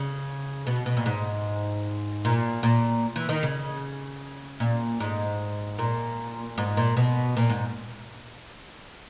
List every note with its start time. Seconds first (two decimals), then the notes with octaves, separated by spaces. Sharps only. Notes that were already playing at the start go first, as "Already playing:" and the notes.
Already playing: C#3
0.67 B2
0.86 B2
0.97 A#2
1.06 G#2
2.25 A#2
2.63 A#2
3.16 E3
3.29 D#3
3.43 C#3
4.60 A#2
5.00 G#2
5.79 A#2
6.58 G#2
6.77 A#2
6.97 B2
7.37 A#2
7.49 G#2